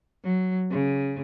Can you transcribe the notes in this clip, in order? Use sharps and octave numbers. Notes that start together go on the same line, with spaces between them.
F#3
C#3